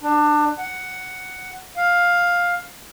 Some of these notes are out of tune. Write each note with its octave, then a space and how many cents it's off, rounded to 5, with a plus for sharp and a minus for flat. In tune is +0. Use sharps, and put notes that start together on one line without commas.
D4 +25
F#5 +5
F5 +10